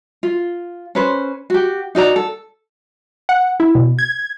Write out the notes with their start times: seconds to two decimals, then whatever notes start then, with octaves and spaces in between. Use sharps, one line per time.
0.23 F4
0.95 C#4 B4 C5
1.50 F#4 G4
1.95 D#4 F#4 D5 A#5
2.16 A4
3.29 F#5
3.60 E4
3.75 B2
3.99 G#6